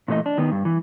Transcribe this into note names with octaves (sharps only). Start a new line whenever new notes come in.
A#2 E3 A3 D#5
D4
D#3 B3
G2
E3